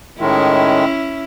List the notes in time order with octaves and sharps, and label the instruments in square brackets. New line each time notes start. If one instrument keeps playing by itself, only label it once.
[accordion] A2 D#3 G#3 [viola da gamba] C#4 E4